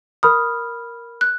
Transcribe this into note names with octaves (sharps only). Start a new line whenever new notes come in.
A#4 B5 D#6 F6
F#6